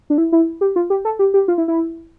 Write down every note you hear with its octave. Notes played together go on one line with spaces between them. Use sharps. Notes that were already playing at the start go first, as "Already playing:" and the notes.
D4
E4
E4
G4
F4
G4
A4
G4
G4
F4
E4
E4